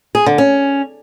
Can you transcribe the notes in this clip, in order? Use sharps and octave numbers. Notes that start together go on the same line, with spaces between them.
G#4
D3
C#4